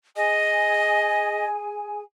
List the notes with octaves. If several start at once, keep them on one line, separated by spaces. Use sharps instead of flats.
G#4 D#5 G#5